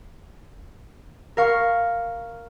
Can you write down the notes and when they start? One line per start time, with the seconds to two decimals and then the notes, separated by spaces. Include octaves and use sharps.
1.37 A#4 F5 C#6